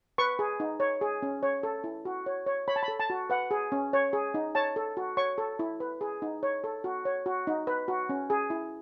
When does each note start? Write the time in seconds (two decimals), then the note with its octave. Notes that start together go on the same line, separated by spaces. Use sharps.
0.18 B4 C#6
0.39 G#4
0.60 D#4
0.80 C#5
1.01 G#4
1.22 C#4
1.43 C#5
1.63 A4
1.84 E4
2.05 F#4
2.26 C#5
2.46 C#5
2.68 C#5 B5
2.76 A5
2.83 B5
2.88 A4
3.00 A5
3.10 F#4
3.30 B4 F#5
3.51 G#4
3.72 C#4
3.93 C#5
4.13 G#4
4.34 D#4
4.55 C#5 A5
4.76 A4
4.97 F#4
5.17 C#5 C#6
5.38 A4
5.59 E4
5.80 B4
6.01 G#4
6.22 D#4
6.43 C#5
6.64 A4
6.84 F#4
7.05 C#5
7.26 F#4
7.47 D#4
7.67 B4
7.88 F#4
8.09 C#4
8.30 G#4
8.50 E4